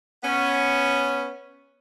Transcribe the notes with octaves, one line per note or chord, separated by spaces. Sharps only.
B3 C#4